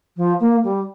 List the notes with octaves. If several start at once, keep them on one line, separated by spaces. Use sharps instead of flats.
F3
A#3
G3